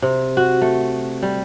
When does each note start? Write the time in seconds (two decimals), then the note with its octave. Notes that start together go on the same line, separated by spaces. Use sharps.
0.02 C3
0.37 F#4
0.61 A3
1.22 G3